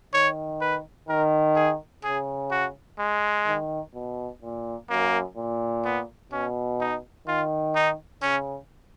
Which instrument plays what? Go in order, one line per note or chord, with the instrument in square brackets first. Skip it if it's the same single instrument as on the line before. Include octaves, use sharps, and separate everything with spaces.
[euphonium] D#3 [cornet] C#5
[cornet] B4
[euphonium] D#3 [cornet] A#4
[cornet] G#4
[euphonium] C#3 [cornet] G#4
[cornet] F#4
G#3
[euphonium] D#3
B2
A#2
[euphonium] F#2 [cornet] A#3
[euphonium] A#2
[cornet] B3
[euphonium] B2 [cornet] C#4
[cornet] D#4
[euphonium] D#3 [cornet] F4
[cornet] D#4
[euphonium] C#3 [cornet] C#4